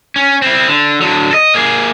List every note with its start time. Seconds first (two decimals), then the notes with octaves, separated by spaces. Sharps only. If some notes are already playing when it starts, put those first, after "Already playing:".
0.16 C#4
0.42 C4 E4
0.68 D3
1.01 D3 F#3
1.31 A4 D#5
1.55 A#3 G#4